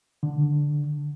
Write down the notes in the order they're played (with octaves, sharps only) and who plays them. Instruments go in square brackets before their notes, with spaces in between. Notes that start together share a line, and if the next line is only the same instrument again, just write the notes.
[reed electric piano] D3